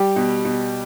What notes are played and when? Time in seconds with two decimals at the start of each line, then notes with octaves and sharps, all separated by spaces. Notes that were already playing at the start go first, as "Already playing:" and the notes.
Already playing: G3 G4
0.16 B2
0.45 B2